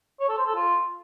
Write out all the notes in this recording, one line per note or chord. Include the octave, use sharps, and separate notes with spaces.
C#5
A4
C5
A4
F4